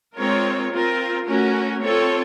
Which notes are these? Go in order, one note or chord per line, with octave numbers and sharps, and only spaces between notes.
G#3 C4 F4 A#4 C#5
C4 F4 A#4
A3 C#4 F#4 A#4
C4 F4 A4 C#5